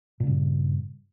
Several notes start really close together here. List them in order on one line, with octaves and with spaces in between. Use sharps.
A#2 C#3 G2